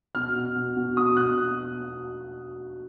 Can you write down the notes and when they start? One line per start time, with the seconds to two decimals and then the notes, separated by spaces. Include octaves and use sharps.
0.15 B2 F6
0.36 B2
0.56 B2
0.76 B2
0.97 B2 D#6
1.17 B2 F#6
1.37 B2